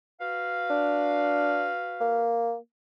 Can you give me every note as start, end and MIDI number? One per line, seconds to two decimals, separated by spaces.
0.20 2.35 66
0.20 2.35 71
0.20 2.35 77
0.70 1.70 62
2.01 2.56 58